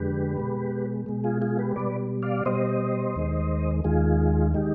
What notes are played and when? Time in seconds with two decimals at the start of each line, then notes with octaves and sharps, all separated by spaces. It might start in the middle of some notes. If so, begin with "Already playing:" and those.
Already playing: F2 D3 G#3 G4 B4
0.37 B2 G#3
1.06 B2 G#3
1.24 F4 G#4
1.41 F4 G#4
1.59 G4 B4
1.76 B2 G3 B4 D5
2.22 D5 F5
2.45 B2 G3 C5 D#5
3.15 D#2 D#3 G#3
3.84 D#2 D#3 G#3 F4 G#4
4.54 D#3 G#3 D#4 G4